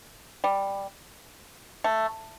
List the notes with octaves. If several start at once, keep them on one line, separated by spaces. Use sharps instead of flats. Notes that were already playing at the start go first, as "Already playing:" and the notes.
G3
A3